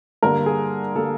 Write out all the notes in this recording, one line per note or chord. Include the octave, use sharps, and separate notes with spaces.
G2 D3 G3 A#3 A#4
G#4
D3 G3 A#3 A4